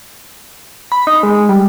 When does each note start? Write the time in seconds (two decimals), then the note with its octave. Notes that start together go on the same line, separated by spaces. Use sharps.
0.92 B5
1.07 D#4
1.23 G#3
1.49 G3